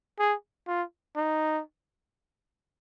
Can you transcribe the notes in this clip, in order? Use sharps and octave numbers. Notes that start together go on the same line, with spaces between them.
G#4
F4
D#4